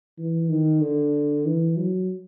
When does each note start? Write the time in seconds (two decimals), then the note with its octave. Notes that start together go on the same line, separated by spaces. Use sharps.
0.18 E3
0.49 D#3
0.81 D3
1.46 E3
1.77 F#3